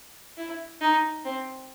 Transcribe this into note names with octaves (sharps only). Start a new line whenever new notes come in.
E4
D#4
C4